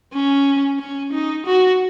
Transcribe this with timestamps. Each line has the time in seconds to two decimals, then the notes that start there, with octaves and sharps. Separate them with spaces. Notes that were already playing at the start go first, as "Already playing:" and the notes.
0.13 C#4
0.79 C#4
1.13 D#4
1.46 F#4